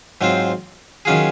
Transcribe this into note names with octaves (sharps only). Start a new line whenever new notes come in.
G#2 F#3 C4 F4 C5
D#3 F#3 C#4 F4 G#4